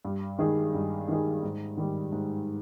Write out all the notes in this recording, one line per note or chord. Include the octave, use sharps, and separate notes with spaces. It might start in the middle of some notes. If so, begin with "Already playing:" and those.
G2
D#3 G#3 D#4 G#4
G2
D#3 G#3 D#4 G#4
G#2
D#3 G3
G#2